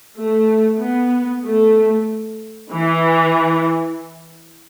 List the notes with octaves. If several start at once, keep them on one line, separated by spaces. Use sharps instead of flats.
A3
B3
A3
E3